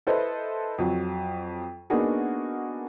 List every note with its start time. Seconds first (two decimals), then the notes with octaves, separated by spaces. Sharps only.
0.07 E4 A4 B4 C5 D#5
0.78 F2 F#3
1.90 A#3 B3 D4 D#4 F#4 G#4